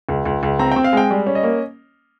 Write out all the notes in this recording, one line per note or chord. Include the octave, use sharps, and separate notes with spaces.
C#2
C#2
C#2
C4 A#5
C4 G5
F5
G#3 G5
G3
C#4
D#5
A#3